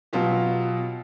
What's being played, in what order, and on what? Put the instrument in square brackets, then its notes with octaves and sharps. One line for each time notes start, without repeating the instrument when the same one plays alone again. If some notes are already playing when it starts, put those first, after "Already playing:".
[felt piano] B2 F#3 F4 G4